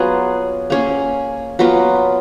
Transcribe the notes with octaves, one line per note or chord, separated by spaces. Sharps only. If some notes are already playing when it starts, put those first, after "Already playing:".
Already playing: F#3 B3 F4 G#4
A#3 C#4 G#4
F#3 B3 F4